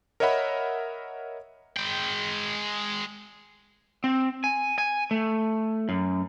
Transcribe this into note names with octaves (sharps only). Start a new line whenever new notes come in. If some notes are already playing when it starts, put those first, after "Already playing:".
A#4 C#5 D#5 E5 F#5 B5
G#3 G5
C4
G#5
G#5
A3
F#2